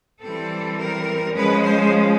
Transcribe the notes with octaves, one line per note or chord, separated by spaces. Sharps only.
E3 G3 C4 A4
A#4
F3 G#3 C#4 B4
C5